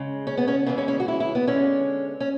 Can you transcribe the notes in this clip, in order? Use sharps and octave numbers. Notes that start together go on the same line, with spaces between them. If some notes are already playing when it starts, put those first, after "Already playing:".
Already playing: C#3 G#3
C#4
B3
C#4
C#3 E3 G#3 B3
C#4
C#4
F#4
E4
E4
B3
D3 G#3 C#4
C#4